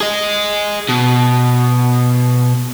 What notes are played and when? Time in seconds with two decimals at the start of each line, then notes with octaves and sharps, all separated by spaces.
0.01 G#4 D#5
0.89 B2